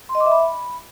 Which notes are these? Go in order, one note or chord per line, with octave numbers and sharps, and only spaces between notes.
C6
D#5
D6
E5
B5